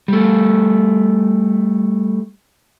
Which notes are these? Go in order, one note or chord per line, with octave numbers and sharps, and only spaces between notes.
G3 A3